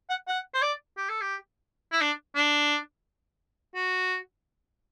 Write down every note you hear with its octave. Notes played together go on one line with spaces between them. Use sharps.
F#5
F#5
C5
D5
G4
A4
G4
E4
D4
D4
F#4